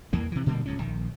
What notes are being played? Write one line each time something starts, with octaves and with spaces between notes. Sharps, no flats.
E2 E3 A#3
C3 E3
A#2 D3 G3 A#3
D1 C#2 G#2 C#4
A#1 D#3